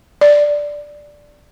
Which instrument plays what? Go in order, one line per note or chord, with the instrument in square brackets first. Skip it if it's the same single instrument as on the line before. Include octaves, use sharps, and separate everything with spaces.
[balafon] D5